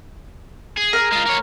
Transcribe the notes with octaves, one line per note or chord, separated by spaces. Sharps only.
G#4
A#4
G#3 F4
A#3 C#5